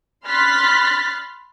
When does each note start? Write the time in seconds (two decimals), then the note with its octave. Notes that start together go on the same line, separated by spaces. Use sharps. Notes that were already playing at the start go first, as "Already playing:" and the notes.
0.25 B5 C6 F6 F#6 A6 B6